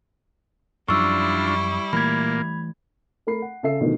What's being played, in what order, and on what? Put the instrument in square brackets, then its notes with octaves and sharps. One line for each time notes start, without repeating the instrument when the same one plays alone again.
[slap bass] F#2 F3 [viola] G3 E4 [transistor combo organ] D4 F4 [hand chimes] C#6 E6
[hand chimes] C#6
[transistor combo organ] A#2 A#3 [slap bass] E3 A3 [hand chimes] B5 G#6
[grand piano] A3 A#4 B5 C7
F#5
C#3 A4 E5 C7
B2 D3 D#3 F3 A3 A#4